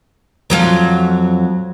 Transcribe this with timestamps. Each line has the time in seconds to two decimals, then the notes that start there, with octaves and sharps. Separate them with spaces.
0.50 F2 F#3 F4